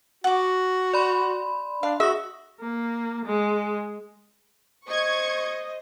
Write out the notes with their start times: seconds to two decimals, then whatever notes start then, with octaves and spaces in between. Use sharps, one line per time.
0.24 F#4 F#5 D6
0.93 D5 B5 C6
1.83 D4 F5
2.00 F#4 G#4 E5 D#6 A#6
2.61 A#3
3.26 G#3
4.88 C5 D#5 C#6 G#6